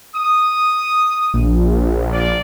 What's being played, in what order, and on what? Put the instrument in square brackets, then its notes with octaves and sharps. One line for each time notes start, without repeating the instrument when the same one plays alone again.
[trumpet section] D#6
[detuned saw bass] A#1
[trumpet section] F4 D5